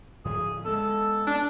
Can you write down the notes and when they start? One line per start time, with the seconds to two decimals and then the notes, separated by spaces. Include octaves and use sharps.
0.25 A2 D3 F3 G#4
0.65 G#3 B3 A4
1.27 D4